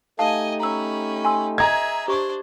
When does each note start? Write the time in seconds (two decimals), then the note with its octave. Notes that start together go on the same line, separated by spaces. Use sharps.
0.19 A3 D#4 G4 D#5 F5 G#5 A5
0.60 C#4 A#5 B5 E6
1.25 G#5 C6 E6
1.58 G#4 D#5 E5 A#5 G#6
2.08 D4 G4 C5 C#6